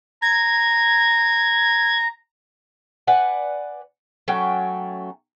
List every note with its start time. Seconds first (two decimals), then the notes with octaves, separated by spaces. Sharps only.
0.22 A#5 G#6
3.07 B4 D5 F#5 G#5
4.28 F#3 A3 C#4 G5